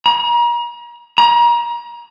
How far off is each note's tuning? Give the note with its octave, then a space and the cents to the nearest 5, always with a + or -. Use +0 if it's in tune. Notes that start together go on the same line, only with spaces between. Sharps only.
A#5 +40
A#5 +30